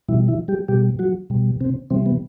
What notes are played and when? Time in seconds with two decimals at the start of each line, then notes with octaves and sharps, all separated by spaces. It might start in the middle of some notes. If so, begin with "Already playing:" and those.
0.08 B2 E3 G3 E4
0.28 E3 E4
0.48 G3 G4
0.68 B2 G3 G4
0.99 F#3 F#4
1.30 B2 G3
1.61 C3 C4
1.90 C3 E3 G3 C4
2.06 B3